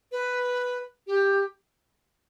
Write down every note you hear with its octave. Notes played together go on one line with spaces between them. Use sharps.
B4
G4